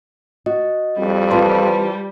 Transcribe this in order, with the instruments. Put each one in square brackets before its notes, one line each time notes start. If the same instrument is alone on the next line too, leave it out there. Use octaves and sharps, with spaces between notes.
[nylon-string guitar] F#4 [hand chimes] D#5
[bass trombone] F2 [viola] G3
[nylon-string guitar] E3 C4 F4 [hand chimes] B4 A5 C6